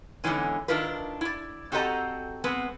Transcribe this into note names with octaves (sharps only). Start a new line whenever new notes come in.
E2 G#2 B2 D3 E3 C#4
D#3 D4 E4 F4 A#4 B4
E4 D5
C4 F#4 G4 A4 D#5 A#5
G#3 B3 C4 B4